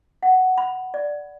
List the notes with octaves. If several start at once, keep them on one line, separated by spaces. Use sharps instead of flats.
F#5
B5
D5